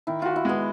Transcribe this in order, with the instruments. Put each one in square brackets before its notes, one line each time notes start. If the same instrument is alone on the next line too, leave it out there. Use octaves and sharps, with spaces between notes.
[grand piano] D#3 [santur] E4
[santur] F4 [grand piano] F#4
[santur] E4
[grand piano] G#3 [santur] B3